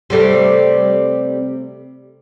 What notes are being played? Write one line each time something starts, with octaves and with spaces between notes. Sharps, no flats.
C3 G3 A3